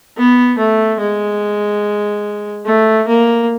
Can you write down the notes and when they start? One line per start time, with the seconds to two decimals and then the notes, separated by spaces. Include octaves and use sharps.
0.17 B3
0.59 A3
1.00 G#3
2.66 A3
3.08 A#3